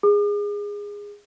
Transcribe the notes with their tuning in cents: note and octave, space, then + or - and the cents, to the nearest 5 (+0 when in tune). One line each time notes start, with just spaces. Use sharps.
G#4 -15 D6 +45